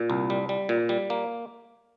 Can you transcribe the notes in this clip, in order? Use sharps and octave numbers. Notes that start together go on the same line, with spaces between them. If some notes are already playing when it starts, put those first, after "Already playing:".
Already playing: A#2
C2
G3
G3
A#2
G3
A#3